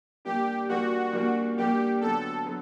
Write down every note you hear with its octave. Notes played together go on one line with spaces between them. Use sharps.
A#2 G3 A#3 D4 G4
A#2 G3 A#3 D4 F#4
A#2 G3 A#3 D4
A#2 G3 A#3 D4 G4
D3 F#3 B3 A4
D3 F#3 B3